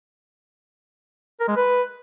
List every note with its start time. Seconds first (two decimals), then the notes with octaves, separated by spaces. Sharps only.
1.40 A#4
1.48 G#3
1.56 B4